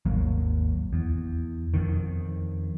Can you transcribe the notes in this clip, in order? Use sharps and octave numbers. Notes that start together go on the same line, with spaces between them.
G#1 D#2 F#3 A#3
E2
F2 D#3